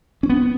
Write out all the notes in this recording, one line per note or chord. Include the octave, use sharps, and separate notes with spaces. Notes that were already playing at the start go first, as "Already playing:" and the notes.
C#4
B3